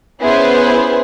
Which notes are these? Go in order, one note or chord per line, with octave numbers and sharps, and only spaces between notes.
B3 C#4 E4 G#4 B4 C5